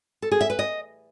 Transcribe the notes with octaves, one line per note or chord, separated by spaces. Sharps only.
A4
G#4
E5
B4
D#5